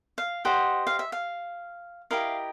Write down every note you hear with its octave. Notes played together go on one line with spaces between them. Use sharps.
F5
G4 C5 D#5 F#5
F5
E5
F5
E4 G4 A#4 D#5 F5